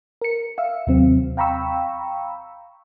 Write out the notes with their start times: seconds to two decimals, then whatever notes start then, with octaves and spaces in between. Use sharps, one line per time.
0.22 A#4 C#7
0.58 E5 F5 E6
0.87 D#2 C3 F#3 C4
1.37 F5 G5 A#5 B5 C#6 E6